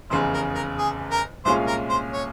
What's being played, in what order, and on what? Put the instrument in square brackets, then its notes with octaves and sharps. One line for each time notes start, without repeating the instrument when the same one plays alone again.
[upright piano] F1 E2 C#3 [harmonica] C5
[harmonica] A#4
A#4
G#4
A#4
[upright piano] C2 A#2 G#3 C#4 F4 [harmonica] C5
[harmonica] A#4
C5
C#5